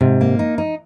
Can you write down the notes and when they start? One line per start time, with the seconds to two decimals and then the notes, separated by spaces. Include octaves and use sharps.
0.01 G#2 C3
0.21 A#3
0.39 D#4
0.58 D#4